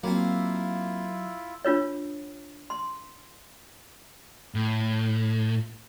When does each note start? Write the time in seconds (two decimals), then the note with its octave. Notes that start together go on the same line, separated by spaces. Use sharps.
0.04 F#3 A#3 C4 E4 F4 E5
1.65 D4 F4 B4 C#5
2.70 C6
4.55 A2